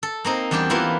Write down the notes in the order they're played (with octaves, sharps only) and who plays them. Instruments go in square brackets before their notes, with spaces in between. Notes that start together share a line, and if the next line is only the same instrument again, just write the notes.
[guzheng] A4
A#3 C4 D#4
E2 G3 D4 G4 G5
E3 A#3 B3 E4 F4